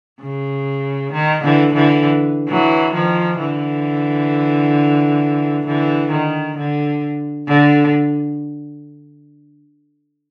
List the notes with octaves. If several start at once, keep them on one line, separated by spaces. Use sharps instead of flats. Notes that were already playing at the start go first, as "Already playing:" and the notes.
C#3
D#3
D3 E3
D3 E3
E3 F#3
D#3 F3
D3 E3
D3 E3
D#3
D3
D3